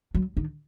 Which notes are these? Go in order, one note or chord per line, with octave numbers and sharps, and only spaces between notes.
F#3
D#3